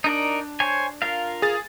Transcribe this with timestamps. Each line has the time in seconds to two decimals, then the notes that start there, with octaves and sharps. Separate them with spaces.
0.04 D4 D#4 A#4 D5
0.60 C5 C#5 G#5
1.02 F4 A#4 F5
1.42 G#4 A6